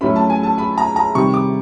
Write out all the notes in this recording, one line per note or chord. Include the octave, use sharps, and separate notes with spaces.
A2 F#3 A3 C#4 B5
A5
G#5
A5
B5
A#5
A#5
C3 D#3 G3 C#6
D6